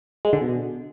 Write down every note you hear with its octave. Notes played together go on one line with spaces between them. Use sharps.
G#3
D3
B2